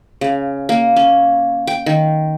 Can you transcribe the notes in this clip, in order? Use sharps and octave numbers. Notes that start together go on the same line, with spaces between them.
C#3
A#3
C#4
G5
D#3